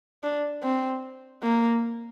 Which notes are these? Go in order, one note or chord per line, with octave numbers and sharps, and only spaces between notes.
D4
C4
A#3